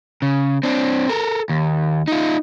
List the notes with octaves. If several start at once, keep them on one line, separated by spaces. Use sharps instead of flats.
C#3
C4 D4
A4 A#4
D#2
D#4 F4